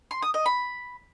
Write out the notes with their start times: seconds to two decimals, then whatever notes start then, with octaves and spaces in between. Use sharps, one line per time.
0.11 C6
0.22 D#6
0.34 D#5
0.46 B5